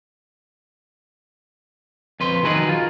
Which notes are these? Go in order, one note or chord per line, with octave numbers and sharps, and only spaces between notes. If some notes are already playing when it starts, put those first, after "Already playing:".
F2 B4 C6
D#3 F#3 F#4 G#4 A#4 B4
F4